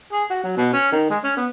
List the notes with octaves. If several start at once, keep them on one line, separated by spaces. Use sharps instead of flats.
G#4
F#4
F#3
B2
C#4
D#3
G#3
C#4
B3